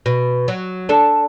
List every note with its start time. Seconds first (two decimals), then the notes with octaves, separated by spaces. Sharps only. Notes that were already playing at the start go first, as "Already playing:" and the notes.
0.06 B2
0.48 F#3
0.89 D4 A4